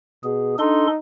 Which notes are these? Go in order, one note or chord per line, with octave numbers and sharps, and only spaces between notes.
B2 G#4
D4 D#4 A4 C6